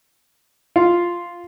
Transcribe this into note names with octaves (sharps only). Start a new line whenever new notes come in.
F4